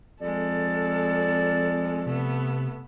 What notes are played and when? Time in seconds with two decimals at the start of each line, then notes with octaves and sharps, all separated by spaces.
0.21 F2 G#3 A4 D5
2.06 C3 A3 B3